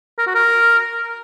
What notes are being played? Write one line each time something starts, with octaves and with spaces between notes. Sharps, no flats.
A#4
F#4
A#4